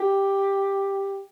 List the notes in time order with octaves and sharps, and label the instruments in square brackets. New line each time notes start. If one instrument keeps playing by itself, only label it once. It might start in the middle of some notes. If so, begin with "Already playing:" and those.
Already playing: [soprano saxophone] G4